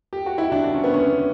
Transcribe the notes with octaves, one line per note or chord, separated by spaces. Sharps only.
G4
F#4
E4
D4
D4
C#4
B3
C#4